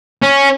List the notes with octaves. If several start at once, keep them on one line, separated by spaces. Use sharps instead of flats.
C#4